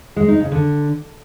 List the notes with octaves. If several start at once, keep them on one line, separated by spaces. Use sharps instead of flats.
G#3
D#4
C#3
D3